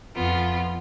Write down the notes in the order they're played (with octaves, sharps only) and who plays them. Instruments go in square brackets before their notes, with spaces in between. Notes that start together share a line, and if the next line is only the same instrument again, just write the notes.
[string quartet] F2 F3 B3 F4